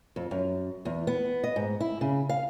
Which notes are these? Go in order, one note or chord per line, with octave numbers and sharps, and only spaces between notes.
F2
F#2
E2
B3
D#5
G#2
E4
C#3
F5